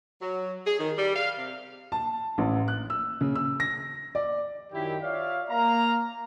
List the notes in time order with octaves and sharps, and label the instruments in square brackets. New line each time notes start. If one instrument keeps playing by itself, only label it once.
[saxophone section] F#3
G#4
D#3
G3
F5
C3
[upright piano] A5
A1
F#6
E6
C#3
E6
A#6
D5
[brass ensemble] F#2 D#3 E4 G4
F4 C#5 D5 E5 F5
A#3 F5 A#5